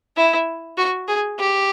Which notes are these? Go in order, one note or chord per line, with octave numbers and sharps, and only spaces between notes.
E4
F#4
G#4
G4